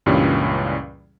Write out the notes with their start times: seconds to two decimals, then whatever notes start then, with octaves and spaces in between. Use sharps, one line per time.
0.06 C#2 G2 A#2 E3 G3 C#4